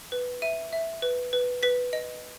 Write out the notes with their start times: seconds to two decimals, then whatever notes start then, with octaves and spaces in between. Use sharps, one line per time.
0.12 B4
0.42 E5 D#7
0.73 E5
1.02 B4
1.33 B4
1.63 B4 B6
1.93 D#5